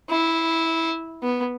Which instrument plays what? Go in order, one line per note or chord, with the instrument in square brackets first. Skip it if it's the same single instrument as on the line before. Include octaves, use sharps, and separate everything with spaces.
[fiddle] E4
B3